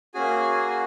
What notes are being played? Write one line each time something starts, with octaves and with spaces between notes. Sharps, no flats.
A#3 C#4 F#4 G#4 G#5